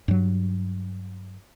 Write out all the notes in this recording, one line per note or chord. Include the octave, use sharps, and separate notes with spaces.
G2 F#3